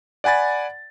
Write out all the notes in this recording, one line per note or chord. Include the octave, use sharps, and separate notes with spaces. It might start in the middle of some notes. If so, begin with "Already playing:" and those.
D5 F#5 G#5 B5 A6